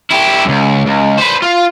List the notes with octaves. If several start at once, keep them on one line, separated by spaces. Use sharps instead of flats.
E4 G4
C#2 F#2
C#2
B4 C5
F4